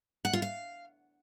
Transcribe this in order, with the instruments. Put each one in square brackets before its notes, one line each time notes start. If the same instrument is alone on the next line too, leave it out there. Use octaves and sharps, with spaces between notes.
[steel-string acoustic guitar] F#5
F4
F5